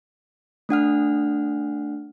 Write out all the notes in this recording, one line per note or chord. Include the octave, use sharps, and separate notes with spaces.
A3 D4 F#5 F6